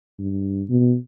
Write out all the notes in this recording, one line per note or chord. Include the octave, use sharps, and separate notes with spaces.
G2
B2